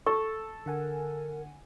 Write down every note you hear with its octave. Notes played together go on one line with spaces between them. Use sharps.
A4 C#6
D3 A#4 F#5 G#5